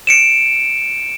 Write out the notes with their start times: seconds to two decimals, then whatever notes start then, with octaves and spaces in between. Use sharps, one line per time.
0.07 C#7 D7 E7